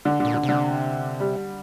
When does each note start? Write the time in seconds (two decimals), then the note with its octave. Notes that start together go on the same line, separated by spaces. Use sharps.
0.05 D3
0.20 A#2 D3
0.34 D3
0.43 C3
0.49 D3
1.20 G3